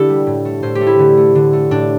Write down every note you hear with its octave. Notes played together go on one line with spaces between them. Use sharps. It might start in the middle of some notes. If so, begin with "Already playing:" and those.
Already playing: D3 A3 D4 E4 G4 A4
G3
A2
A3
A2 C5
G4
A3
E4
D3
A3
D3
A3
A2 D4